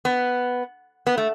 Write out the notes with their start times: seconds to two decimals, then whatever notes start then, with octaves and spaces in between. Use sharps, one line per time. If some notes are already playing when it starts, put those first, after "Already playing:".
0.05 B3
1.07 B3
1.18 A3